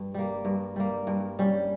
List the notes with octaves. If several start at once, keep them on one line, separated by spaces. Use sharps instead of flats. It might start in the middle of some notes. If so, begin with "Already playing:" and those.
Already playing: G2
G3 A#3
G2
G3 A#3
G2
G3 C#4